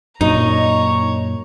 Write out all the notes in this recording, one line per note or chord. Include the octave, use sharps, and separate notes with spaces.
F#2 A#2 D#4 C#5 A#5